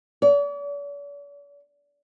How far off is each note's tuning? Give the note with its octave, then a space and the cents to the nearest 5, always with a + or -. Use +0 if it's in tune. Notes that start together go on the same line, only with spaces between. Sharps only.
D5 -45